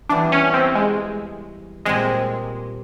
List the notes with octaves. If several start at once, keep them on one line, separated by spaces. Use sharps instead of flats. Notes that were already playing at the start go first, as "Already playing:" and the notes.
E3 G3 B3 D4
C#4
C4
G#3
A#2 G3 G#3 C4